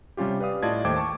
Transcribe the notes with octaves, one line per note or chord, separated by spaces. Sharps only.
C3 G3 C#4 F4 G4
G4 B4 D5 F5 D#6
A2 F4 D5 D#5 A5 G#6
D#2 A3 C5 G5 D6 G#6
A5 C#6 D6